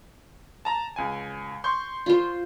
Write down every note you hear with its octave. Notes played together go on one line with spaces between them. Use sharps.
A5 A#5
C#2 G#5
C6 C#6 G6
F4 C5